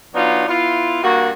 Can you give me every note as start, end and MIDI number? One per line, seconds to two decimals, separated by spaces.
0.15 0.47 54
0.15 0.47 59
0.15 0.47 62
0.15 0.47 63
0.15 0.47 65
0.48 1.01 59
0.48 1.01 64
0.48 1.01 65
1.03 1.32 43
1.03 1.32 58
1.03 1.32 66